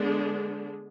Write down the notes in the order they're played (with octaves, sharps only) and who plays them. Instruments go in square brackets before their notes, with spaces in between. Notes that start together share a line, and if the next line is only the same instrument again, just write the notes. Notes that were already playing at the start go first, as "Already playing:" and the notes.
Already playing: [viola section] D3 G#3 B3 D4